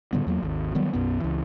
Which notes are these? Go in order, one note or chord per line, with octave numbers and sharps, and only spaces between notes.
A2 D3 G3 B3
E2 F#3 A#3
G#1 D#2
D#3 F#3 G3 B3
B1 F#2 B3
C#2 E3